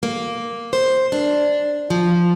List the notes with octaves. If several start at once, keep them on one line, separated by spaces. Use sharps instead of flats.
A#3
C5
D4
F3